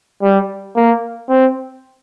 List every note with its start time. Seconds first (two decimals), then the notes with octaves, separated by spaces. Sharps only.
0.22 G3
0.76 A#3
1.29 C4